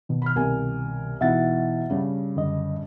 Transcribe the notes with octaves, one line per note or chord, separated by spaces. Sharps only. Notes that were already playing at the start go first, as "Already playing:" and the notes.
B2 D#3
B5 F6
C2 A#4 G#5
B2 E3 D#4 E5 F#5 A6
G2 C#3
F#2 D3 D#5